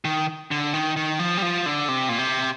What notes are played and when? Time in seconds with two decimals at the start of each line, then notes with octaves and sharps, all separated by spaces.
0.05 D#3
0.51 D3
0.74 D#3
0.96 D#3
1.19 F3
1.37 G3
1.42 F3
1.66 D3
1.88 C3
2.09 A#2
2.18 C3